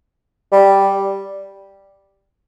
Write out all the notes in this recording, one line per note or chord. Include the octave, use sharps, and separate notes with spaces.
G3